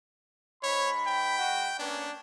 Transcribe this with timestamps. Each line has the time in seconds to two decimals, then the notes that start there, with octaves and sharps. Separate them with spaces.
0.63 G#2 C#5 B5
1.07 G5
1.39 G#3 F#4
1.79 A#3 B3 C#4 D4